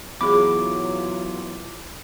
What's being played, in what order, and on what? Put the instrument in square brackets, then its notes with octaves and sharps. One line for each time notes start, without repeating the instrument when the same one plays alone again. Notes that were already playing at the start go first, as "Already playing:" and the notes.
[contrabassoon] E2 [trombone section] F#3 F4 [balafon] G#4 B5 [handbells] D6